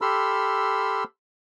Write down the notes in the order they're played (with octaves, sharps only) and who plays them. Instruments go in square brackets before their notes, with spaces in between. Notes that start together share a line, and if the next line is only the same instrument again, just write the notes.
[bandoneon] G4 A4 B5 C6 E6 F6